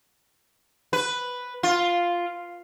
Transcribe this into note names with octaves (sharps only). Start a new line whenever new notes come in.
B4
F4